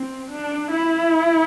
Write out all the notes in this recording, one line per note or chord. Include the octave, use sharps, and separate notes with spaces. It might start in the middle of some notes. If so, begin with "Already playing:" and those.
Already playing: C4
D4
E4